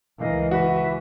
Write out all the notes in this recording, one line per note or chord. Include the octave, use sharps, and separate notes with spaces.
C#2 E3 A#4 D#5 F5
F#4 B4 E5